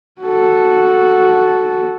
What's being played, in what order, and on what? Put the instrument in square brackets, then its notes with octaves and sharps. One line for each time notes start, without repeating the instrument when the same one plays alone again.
[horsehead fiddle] F#4 A4